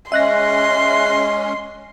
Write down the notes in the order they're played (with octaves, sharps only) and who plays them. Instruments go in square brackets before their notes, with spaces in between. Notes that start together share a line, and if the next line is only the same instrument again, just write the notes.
[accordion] G#3 C#4 [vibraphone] D#5 [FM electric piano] E5 F#6 A#6 [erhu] C6